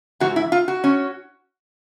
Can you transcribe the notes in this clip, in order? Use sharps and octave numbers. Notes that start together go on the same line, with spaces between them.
G#2 E3 F#4
E4
F4
F#4
C#4